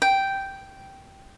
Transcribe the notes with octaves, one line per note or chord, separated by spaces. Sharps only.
G5